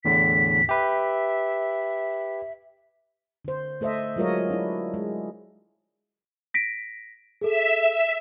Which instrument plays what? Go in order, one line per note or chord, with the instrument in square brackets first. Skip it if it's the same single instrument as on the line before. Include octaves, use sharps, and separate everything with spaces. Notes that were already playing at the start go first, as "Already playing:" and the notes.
[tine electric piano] E2 A2 D3 [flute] B6
[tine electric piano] G4 B4 [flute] E5
[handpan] D3 C5
A3 A4 C5 D#5 E5
F#3 G#3 F4 A#4 C#5 D#5
D4 E4
G#3
[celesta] A#6 B6 D7
[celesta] G#4 A4 [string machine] E5 E6 B6